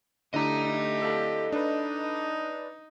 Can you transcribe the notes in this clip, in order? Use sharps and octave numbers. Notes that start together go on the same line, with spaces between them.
D3 A3 D4 E4 G4 D#5 A#5
A4 F5 A5
D4 D#4 B4